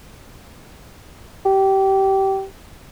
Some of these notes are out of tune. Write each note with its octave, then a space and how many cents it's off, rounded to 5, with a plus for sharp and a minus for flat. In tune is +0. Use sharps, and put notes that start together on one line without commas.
G4 -20